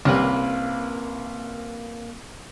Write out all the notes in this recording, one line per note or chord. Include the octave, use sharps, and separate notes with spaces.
C2 A#3 C4 C#4 G4 B4